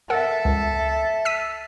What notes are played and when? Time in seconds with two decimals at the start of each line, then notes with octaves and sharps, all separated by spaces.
0.10 A4 A#4 E5 F#5 E6
0.45 C#2
1.25 E6 B6 D#7